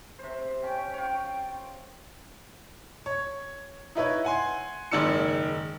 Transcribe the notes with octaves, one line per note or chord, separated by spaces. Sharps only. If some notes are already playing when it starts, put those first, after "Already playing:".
C3 C5
C#4 G5
F4 C#5
C#5
D#4 E4 B4 C#5
F#5 G#5 C6
F#1 G#2 D#3 D5 E6 C#7